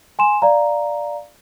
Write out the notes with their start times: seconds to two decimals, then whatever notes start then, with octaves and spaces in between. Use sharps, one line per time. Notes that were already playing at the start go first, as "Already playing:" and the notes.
0.19 G#5 C6 E7
0.42 D5 F5 A#5